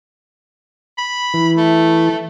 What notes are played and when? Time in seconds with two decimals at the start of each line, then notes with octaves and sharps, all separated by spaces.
0.98 B5
1.34 E3
1.57 A3